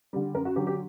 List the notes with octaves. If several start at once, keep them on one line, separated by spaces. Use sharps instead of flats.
D3 G3
F#2 A#4
F#4
D3 F#3 G4
G4